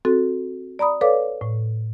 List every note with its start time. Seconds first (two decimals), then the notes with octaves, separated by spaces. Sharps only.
0.05 C4 F#4 A4
0.79 D5 A#5 B5 D#6
1.01 A4 B4 C#5 D5 F5 D6
1.41 A2